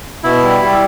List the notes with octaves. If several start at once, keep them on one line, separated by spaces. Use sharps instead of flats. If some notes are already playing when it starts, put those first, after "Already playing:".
B2 E4
G3
G3